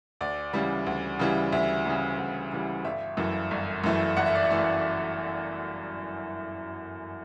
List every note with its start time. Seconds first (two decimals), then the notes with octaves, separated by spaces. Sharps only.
0.21 D2 D5
0.53 C#3 E3 G3
0.86 D2
1.19 C#3 E3 G3
1.52 D2 E5
1.86 C#3 E3 G3
2.19 D2
2.52 C#3 E3 G3
2.84 G1 E5
3.17 F#2 E3 A3
3.51 G1
3.84 F#2 E3 A3
4.17 G1 F#5
4.26 E5
4.35 D5
4.44 E5
4.50 E3 A3